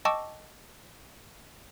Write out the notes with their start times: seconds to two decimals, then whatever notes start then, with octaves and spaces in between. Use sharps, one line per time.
0.05 D#5 G5 A5 C#6 D6 E6